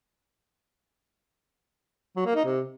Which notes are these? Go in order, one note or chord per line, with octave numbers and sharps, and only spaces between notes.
F#3
A#3
D#4
C3